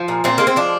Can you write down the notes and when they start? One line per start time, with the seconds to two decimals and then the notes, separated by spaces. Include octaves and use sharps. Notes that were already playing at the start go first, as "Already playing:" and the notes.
Already playing: F3
0.08 A#2
0.24 A#2 C4
0.38 G#3 A#3
0.47 C4
0.56 F3 D4